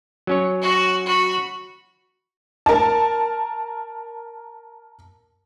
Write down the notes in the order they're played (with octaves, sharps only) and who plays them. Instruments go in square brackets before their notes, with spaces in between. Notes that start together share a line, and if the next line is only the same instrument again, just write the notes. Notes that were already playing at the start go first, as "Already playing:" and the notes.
[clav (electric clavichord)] F#3 C#4 C#5
[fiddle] F#4
F#4 B5
[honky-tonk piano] A#4 A5